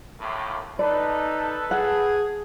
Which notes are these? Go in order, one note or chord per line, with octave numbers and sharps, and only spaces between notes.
D#2 A2
D#4 A4 B4 D5
G#4 F#5